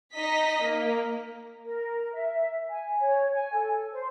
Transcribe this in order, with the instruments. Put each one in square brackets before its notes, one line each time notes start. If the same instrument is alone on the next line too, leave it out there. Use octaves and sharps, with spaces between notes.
[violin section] D#4 D#5 B6
A#3
[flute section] A#4
E5
G#5
C#5
G#5
A4
C5